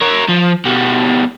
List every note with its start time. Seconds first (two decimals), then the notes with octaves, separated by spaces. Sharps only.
0.02 A#4 C#5
0.29 F3
0.65 B2 G3